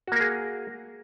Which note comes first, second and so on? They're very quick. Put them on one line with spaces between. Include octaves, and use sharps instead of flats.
F#4 A#3 A#4 G#4